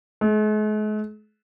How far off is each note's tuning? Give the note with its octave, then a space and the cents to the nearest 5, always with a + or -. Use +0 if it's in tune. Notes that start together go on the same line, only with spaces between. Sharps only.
G#3 +45